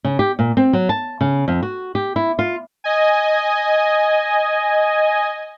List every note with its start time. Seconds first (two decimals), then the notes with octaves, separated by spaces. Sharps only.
0.04 C#3
0.19 G4
0.39 A#2
0.57 C4
0.73 F#3
0.89 A5
1.21 C#3
1.48 F2
1.63 F#4
1.95 G4
2.16 E4
2.39 F4
2.84 D#5 G#5